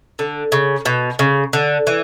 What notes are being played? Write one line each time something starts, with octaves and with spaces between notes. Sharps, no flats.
D3
C#3
B2
C#3
D3
E3